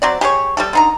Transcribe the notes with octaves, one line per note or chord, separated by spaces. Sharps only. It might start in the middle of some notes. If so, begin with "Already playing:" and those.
F#3 C4 D5
G4 G#4 A#4 C#5
G3 G4 A4
D3 D#4 A#5